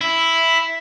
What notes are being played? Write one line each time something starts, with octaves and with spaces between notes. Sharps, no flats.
E4